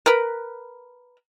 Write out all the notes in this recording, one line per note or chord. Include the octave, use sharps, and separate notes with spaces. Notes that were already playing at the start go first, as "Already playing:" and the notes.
A#4 B4